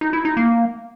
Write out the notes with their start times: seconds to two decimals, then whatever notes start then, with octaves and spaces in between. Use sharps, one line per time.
0.01 D#4
0.13 E4
0.25 D#4
0.37 A#3